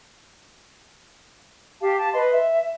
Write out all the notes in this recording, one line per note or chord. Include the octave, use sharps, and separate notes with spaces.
G4 F5 A5
A5
B4 D#5 C6
E5